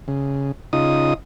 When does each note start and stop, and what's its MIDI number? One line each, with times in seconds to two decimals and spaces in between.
0.08 0.52 49
0.73 1.14 49
0.73 1.14 63
0.73 1.14 65
0.73 1.14 87